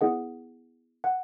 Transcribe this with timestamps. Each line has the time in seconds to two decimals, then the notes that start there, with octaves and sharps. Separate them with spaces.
0.01 B3 E4 G#4 D#5 F#5
1.04 F#5